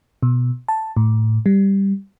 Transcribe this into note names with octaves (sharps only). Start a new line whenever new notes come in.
B2
A5
A2
G3